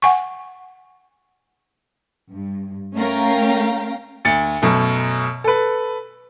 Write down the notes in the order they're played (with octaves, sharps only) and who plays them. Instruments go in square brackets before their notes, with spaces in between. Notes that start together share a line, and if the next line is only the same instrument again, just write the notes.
[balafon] F#5 G#5 C#6
[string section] G2
A3 C#4 A#4 F5 G5
[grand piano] D2 A6 C#7
F#2 B2 A3
A4 B4